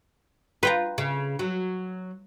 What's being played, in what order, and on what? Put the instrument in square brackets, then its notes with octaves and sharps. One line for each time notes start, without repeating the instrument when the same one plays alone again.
[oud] F4 [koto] B4 G5 A#5
[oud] C#3
F#3